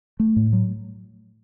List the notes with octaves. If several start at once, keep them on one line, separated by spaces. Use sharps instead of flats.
A3
A2
F#3